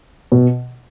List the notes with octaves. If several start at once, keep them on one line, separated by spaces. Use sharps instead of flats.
B2